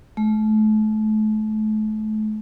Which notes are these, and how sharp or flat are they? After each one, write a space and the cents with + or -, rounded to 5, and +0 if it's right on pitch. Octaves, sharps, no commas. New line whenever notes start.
A3 -35